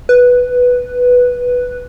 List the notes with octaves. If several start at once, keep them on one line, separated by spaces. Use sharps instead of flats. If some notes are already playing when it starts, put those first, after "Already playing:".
B4